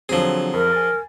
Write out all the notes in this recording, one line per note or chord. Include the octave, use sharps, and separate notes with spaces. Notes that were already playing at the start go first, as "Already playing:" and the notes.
D3 F3 F#3 C4 G#4
F2 A#4
G#5 A6